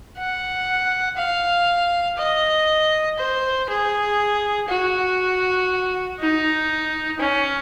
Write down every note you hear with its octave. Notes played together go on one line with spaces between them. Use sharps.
F#5
F5
D#5
C5
G#4
F#4
D#4
C#4